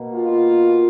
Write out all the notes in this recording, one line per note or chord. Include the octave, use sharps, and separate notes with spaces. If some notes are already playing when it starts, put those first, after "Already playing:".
Already playing: B2 A#3
F4